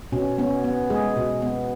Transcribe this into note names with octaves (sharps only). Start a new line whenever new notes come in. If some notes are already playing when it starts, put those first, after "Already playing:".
B2 C#4
B3 C#4
B3
G#3 G#4
B2
B3